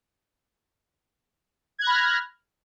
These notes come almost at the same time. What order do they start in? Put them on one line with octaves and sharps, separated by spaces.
G#6 F#6 A#6 B5 F6